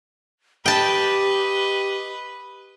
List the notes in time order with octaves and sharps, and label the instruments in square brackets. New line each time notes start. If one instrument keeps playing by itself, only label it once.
[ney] G4 [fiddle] B4 [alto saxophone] D#5 [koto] G5 A5